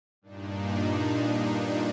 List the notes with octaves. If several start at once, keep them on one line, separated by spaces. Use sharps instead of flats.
G2 A#2 D4 D#4